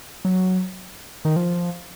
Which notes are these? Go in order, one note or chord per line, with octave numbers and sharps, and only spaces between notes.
F#3
D#3
F3